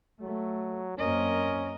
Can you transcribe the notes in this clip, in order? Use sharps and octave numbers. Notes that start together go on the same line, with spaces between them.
F#3 A3
F#2 A#3 C4 C#4 A#4 D#5